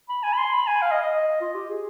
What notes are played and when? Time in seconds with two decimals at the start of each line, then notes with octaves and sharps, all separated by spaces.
0.09 B5
0.23 G#5
0.33 B5
0.38 C6
0.53 B5
0.67 G#5
0.82 F5
0.91 D#5
1.02 D#5
1.41 F4
1.55 G4
1.70 G#4